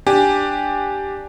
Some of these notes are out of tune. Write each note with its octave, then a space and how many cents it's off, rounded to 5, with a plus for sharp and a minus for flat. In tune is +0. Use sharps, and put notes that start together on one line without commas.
D4 +0 G4 +0 G#5 +0